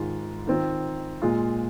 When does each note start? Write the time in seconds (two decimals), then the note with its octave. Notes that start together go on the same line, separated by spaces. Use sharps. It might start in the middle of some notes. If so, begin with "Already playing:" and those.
Already playing: G#2 D#3 G#3 F4
0.47 D#3 C4 F4
1.22 A#2 G#3 F4